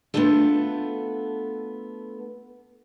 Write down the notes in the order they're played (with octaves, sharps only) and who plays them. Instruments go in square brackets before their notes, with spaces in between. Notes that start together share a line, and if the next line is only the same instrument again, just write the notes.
[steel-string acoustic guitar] A3 B3 C4 D4 F4 A4